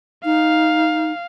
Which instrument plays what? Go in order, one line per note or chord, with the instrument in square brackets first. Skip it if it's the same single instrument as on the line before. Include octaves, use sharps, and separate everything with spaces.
[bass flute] D#4 [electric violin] F5